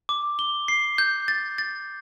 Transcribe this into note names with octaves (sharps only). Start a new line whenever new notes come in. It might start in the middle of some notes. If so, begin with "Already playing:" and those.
D6
G7
C7
G6
A6
A6